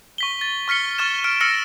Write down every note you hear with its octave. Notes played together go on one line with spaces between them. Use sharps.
C#6 B6 G7
A6
C#6 F6 B6 C#7 G7
C#6 F6 A6 E7
F6 D7
E6 F6 A#6 C#7 E7